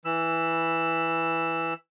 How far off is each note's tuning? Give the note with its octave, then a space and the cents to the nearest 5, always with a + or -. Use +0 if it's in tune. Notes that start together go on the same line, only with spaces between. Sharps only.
E3 +0 B5 +0 E6 +10